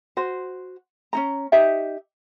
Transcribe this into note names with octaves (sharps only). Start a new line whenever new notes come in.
F#4 C5
C#4 D#4 A#5
D#4 G4 E5